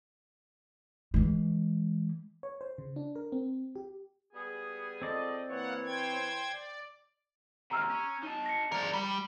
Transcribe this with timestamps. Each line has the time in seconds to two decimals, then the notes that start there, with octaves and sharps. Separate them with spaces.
1.14 E3 G#3
2.43 C#5
2.61 C5
2.78 C#3
2.96 D4
3.16 A#4
3.32 C4
3.76 G4
4.33 G3 B3 G#4
5.02 C#2 C4 A4 D5 D#5
5.50 E3 A#3 B4 C#5 F#5
5.85 C5 G5 G#6
6.52 D5
7.71 D#2 C3 A#5 E6 F6
7.90 C#4
8.23 D#4 A5
8.46 A#6 C#7
8.72 F3 G#4 A#4 D5
8.93 G3 B5